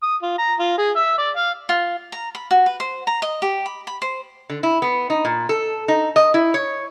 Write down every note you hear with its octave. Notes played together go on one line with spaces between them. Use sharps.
D#6
F4
A#5
F4
G#4
E5
D5
F5
F4
A#5
B5
F#4
B4
C5
A#5
D#5
G4
B5
B5
C5
D3
E4
B3
D#4
A#2
A4
D#4
D#5
E4
C#5